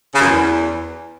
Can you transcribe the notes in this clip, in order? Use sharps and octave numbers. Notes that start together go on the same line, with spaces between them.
C#3
F#2
E2